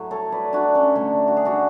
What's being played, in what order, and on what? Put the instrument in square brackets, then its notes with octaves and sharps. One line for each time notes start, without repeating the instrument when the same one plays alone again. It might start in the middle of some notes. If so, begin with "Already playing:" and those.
Already playing: [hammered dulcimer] A2 F#3 A3 F#4
A4 C#5
B4 D5
D4 F#4
C#4
D3 A3 D4
F#4
G#4
D4 F#4